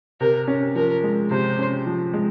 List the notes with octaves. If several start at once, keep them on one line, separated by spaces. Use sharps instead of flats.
C3 A#4
C#4
F3 A#4
G#3
C3 C5
C#4
F3
G#3